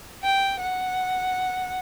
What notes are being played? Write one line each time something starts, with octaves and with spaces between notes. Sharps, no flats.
G5
F#5